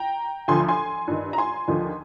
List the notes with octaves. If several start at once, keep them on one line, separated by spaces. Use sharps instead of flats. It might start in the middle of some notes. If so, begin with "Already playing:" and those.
Already playing: G5 A#5
D2 D3 F3 G#5 C6
G#5 C6
G2 D#3
A#5
G#5 C6
D#2 D3 F3